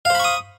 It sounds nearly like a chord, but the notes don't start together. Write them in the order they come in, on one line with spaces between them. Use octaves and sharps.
F5 C5 B5 C#6 D#6